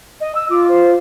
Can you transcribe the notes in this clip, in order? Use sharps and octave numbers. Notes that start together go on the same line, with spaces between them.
D#5
E6
F4 D6
C5